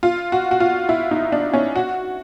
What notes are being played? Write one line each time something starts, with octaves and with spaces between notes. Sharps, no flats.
F4
F#4
F#4
F4
E4
D#4
D4
C#4
F#4